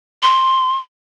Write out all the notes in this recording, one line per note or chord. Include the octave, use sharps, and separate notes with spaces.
C6